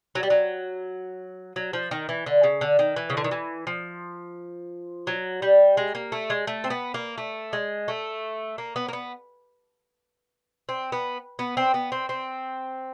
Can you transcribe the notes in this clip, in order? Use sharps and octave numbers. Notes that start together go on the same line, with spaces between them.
F#3
G3
F#3
F#3
F3
D#3
E3
D3
C#3
D3
D#3
E3
C#3
D3
D#3
E3
F3
F#3
G3
G#3
A#3
A3
G#3
A3
C4
B3
A#3
A3
G#3
A3
A#3
B3
A#3
B3
C4
B3
B3
C4
B3
C4
C4